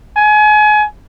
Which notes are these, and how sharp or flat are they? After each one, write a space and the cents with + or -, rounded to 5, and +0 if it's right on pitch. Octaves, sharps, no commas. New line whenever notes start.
G#5 +30